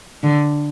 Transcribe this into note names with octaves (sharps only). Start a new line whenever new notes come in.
D3